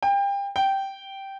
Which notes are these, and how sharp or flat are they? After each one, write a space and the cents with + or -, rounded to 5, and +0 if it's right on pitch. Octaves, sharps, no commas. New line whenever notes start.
G5 +30
G5 -10